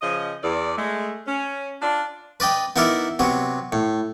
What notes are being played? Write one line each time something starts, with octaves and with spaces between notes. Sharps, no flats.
C#3 F3 D#5
E2 D5
G#3 A3
C#4
D4 F4
B4 D5 D#5 G5
B3 D#4 E4 A#4 D5 E5
C3 F#3 B3
A2